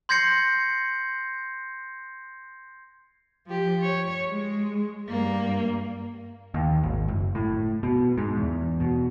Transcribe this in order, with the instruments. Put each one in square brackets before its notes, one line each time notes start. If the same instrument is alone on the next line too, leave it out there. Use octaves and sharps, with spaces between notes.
[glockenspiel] C6 G6 G#6 A#6 C7 C#7
[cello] F3 G4
C#5
G#3
G2 A#3
[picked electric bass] D#2
G#1
F#1
A2
B2
G#2
E2
B2